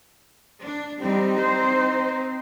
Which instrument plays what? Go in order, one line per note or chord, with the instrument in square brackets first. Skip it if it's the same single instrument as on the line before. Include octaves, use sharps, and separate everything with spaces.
[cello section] D4
[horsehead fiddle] G3 [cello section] C4 D#4
[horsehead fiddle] C5